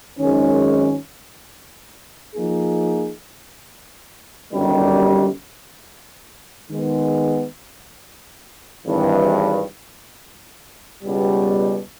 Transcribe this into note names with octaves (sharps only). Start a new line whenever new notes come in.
G#1 F#2 D#3 G#3 C#4
F3 A#3 D#4 G#4
G1 F#2 D#3 G3
D#3 G#3 B3
G#1 G2 E3
C#2 B2 G3